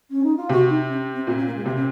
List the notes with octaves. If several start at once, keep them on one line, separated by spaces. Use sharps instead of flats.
C#4
D#4
F4
C3 F#4
D#4
C#4
C4
A#2 C4
C#4
A#3
G#3
C3 A#3
C#4